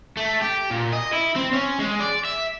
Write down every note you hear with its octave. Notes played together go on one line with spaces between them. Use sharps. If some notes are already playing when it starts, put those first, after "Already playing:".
A3
G4
A#2
D#5
E4
C4
C#4
G#3
D5
E5